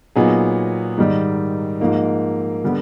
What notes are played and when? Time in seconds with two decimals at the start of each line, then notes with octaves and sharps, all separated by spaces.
0.16 A#2 F#3 B3 D#4 G#4
0.97 G#2 D#3 G3
1.80 G#2 F3 A#3 D#4
2.64 D3 G3 B3